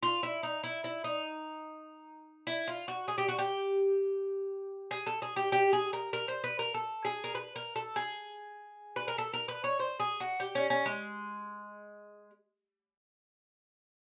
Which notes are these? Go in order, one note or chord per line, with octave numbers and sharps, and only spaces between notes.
F4
E4
D#4
E4
E4
D#4
E4
F4
F#4
G#4
G4
F#4
G4
G#4
A4
G#4
G4
G4
G#4
A#4
A#4
C5
B4
A#4
A4
G#4
A#4
B4
A#4
A4
G#4
B4
A#4
A4
A#4
B4
C#5
C5
G#4
F#4
G4
C#4
C#4
G#3